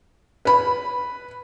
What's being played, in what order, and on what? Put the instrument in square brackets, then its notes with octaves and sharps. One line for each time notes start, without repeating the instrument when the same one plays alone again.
[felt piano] B4 B5